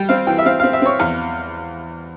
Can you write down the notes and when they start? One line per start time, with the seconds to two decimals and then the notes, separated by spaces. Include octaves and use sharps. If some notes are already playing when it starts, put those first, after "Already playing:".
Already playing: G3 G5
0.09 C4 F5
0.27 E3 G5
0.38 E5
0.46 C4 F5
0.60 C4 F5
0.73 E5
0.82 C4 C#5
0.99 E2 F5